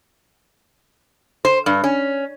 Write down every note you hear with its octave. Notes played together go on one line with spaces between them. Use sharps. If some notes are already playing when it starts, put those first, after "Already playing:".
C5
G2
C#4